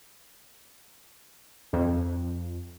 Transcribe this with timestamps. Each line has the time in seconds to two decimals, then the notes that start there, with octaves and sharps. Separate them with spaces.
1.73 F2